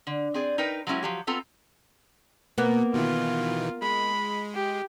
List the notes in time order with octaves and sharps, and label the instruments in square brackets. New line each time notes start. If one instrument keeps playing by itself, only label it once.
[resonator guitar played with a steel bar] D3
C4 G#4 D5
D#4 A#4 B4 G5
F#3 G#3 A#3 C#4 E4 G4
F3 F#3 G4
B3 C4 F4 A4 A#5
[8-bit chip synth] B2 [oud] A#3 B3
[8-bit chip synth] B2 D#3 E3 [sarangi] F4
[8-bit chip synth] G#3 [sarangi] B5
[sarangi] G4